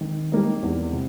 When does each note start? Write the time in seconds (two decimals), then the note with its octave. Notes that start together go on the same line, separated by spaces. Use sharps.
0.01 D#3
0.32 G3 A#3 D#4
0.63 E2
0.93 C3